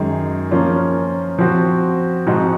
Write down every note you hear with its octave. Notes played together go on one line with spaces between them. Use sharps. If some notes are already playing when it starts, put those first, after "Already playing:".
Already playing: F#2 D#3 G#3
F3 A#3 C#4 F4
F3 C4 F#4
G#2 F3 C4 D#4 F#4